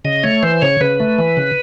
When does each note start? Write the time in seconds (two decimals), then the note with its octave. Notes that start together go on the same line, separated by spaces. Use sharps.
0.05 C#3 D#5
0.23 A3 C#5
0.43 E3 C5
0.62 C#3 C#5
0.81 C#3 B4
1.00 A3
1.18 E3
1.37 C#3